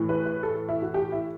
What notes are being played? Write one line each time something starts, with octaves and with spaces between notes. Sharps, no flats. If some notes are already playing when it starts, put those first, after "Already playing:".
Already playing: A2 E3
B4
B4
A4
E4
F#4
G4
E4